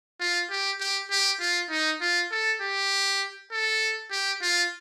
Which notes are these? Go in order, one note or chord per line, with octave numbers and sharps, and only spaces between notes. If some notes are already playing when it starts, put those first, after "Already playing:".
F4
G4
G4
G4
F4
D#4
F4
A4
G4
A4
G4
F4